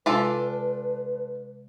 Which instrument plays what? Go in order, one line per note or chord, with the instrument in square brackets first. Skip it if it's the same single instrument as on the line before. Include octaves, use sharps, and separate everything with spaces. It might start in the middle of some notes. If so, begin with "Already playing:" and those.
[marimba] C3 G#3 [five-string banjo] D4 F4 A4 [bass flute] B4